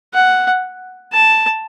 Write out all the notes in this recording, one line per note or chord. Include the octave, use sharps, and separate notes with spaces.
F#5
A5